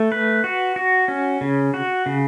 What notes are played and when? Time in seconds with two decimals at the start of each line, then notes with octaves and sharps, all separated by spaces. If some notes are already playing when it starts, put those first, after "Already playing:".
Already playing: A3
0.12 B4
0.44 F#4
0.76 F#4
1.08 C#4
1.41 C#3
1.74 F#4
2.06 C#3